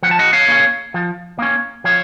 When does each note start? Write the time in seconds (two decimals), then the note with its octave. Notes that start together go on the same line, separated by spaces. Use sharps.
0.02 F3 F#5
0.11 A5
0.19 D#5 F#5
0.33 C#5 F5
0.48 A#3 C#4
0.94 F3
1.39 A#3 C#4
1.84 F3 C#5 F5